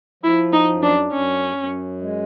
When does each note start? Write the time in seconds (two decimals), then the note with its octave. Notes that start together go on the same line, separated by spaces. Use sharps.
0.23 F3 E4
0.53 D#4
0.68 F#2
0.83 D4
1.12 F#2 C#4
1.56 F#2
2.01 G#3